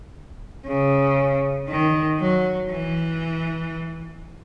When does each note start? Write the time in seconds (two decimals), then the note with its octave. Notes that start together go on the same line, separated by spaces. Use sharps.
0.66 C#3
1.69 D#3
2.20 F#3
2.70 E3